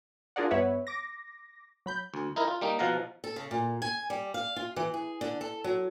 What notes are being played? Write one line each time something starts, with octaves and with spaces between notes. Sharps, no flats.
D4 F4 G#4 A#4 D5 F#5
G2 B3 B4 C#5 E5 F#5
D6 A#6
F#3 B5 G6
D2
D#4 E4 A#4
F4
G3 A#3 D#4
B2 F3 F5 F#5 A#5
A4
C#3
A#2
G#5
G3
F5
F4
E3
G#4
D3
A4
F#3